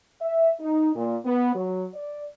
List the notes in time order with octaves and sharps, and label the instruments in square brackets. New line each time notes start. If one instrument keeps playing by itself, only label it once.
[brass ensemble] E5
D#4
A#2
B3
F#3
D5